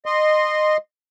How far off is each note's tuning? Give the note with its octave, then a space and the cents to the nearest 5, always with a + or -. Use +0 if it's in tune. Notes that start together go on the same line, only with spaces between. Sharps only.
D#5 -20 C6 +0